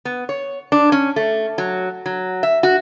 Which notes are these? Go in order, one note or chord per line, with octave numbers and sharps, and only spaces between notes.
B3
C#5
D4
C#4
A3
F#3
F#3
E5
F#4